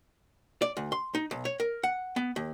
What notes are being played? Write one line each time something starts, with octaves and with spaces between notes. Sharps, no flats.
D5
D2
C6
D#4
B1
C#5
A#4
F#5
B3
D#2